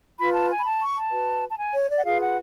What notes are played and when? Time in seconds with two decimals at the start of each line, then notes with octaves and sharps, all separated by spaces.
0.19 F4 B4 B5
0.34 A5
0.50 G#5
0.59 B5
0.65 A5
0.80 C#6
0.96 A5
1.12 F#4 B4
1.49 A5
1.58 G#5
1.73 C#5
1.89 D5
1.98 F#5
2.04 F4 G#4 B4 F5
2.20 F#5